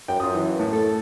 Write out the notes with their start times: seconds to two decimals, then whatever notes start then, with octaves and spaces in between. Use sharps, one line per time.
0.08 F#2 G5
0.20 F#2 F4 D#6
0.35 E3
0.59 A2
0.72 A4